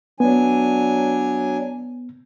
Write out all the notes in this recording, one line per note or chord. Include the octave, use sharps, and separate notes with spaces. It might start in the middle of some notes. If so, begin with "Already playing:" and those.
F#3 B3 D4 G#5